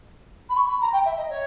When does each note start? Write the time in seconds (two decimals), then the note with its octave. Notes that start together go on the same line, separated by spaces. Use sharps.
0.49 B5
0.56 C#6
0.68 B5
0.81 A#5
0.92 G5
1.05 E5
1.17 D#5
1.29 C#5